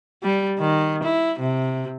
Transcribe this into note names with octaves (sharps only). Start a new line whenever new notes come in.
G3
D#3
E4
C3